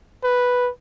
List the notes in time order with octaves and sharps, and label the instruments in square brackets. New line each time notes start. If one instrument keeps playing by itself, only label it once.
[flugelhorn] B4